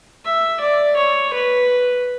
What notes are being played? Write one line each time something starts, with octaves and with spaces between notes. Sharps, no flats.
E5
D5
C#5
B4